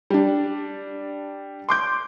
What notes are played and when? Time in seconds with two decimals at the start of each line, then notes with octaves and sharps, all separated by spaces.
0.10 G3 D4
1.69 C6 D6 G6